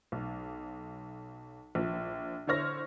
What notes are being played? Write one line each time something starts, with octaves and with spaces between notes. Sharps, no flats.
B1
A#1 F3
D3 E4 C5 C#5 F6 A#6